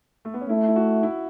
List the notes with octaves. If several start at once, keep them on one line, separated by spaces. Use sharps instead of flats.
A3
B3
C#4
A3 E4
E4
F#4
E4